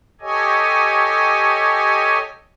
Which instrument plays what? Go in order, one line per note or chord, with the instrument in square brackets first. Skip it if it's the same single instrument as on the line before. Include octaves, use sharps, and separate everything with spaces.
[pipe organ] G4 A4 C#5 D#5 G#5